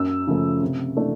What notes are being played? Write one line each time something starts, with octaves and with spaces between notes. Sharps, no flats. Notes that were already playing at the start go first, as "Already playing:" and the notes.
Already playing: F#2 E6
C#3 F3 A3
C3
E3 A3 D4